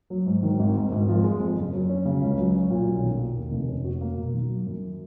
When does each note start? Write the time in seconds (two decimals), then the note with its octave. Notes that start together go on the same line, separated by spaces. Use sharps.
0.10 F#3
0.26 G#2
0.43 D#3
0.59 G#1
0.76 G#2
0.92 G#1
1.08 F3
1.24 G#3
1.40 F2
1.56 F#1
1.73 F#3
1.89 C#4
2.06 C#3
2.21 C#2
2.38 F#3
2.55 C#4
2.70 A#2
2.87 B1
3.03 D#3
3.19 A#3
3.35 D#2
3.51 F1
3.68 C#4
3.84 F#4
4.01 A#3
4.17 B2
4.34 D#3
4.49 F#3
4.66 F#2